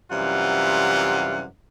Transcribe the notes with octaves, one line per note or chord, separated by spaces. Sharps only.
F#2 C3 E3 G3 F4 F#5